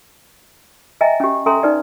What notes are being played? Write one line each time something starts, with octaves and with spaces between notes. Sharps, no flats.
D#5 E5 G5 G#5 A#5
C#4 G4
C#4 A4 E5 G#5 A#5 C6
D#4 B4 D5